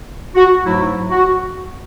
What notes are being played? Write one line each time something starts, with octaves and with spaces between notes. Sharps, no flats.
F#4
G#2 F#3 A3 E4
F#4